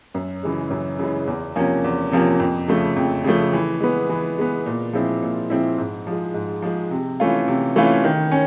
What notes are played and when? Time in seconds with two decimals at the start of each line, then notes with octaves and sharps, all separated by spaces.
0.14 F#2
0.43 C#3 E3 G#3
0.70 F#2
0.99 C#3 E3 G#3
1.27 E2
1.56 C3 F3 A#3 C#4
1.84 E2
2.12 C3 F3 A#3 C#4
2.40 F2
2.68 C#3 F3 A3
2.96 F2
3.24 C#3 F3 A3
3.53 E3
3.81 G#3 B3
4.09 E3
4.38 G#3 B3
4.66 A#2
4.93 F3 G#3 C4 E4
5.22 A#2
5.50 F3 G#3 C4 E4
5.78 G#2
6.07 F3 G#3
6.34 G#2
6.62 F3 G#3
6.91 C3
7.20 E3 A3 C#4 F4
7.48 C3
7.76 E3 A3 C#4 F4
8.04 D#3
8.32 C#4